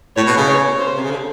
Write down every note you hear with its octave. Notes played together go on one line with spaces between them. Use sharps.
A2 C#5
B2
C#3
C#5
C5
C3
C#3
D3